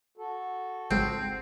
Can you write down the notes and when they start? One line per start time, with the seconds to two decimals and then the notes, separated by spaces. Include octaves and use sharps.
0.17 F#4 A4
0.90 G#1 C#2 G#3 C4